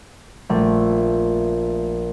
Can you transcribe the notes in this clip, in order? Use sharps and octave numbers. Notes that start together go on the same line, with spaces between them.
A#1 A3